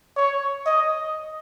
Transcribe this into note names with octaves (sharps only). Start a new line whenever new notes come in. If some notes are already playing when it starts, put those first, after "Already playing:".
C#5
D#5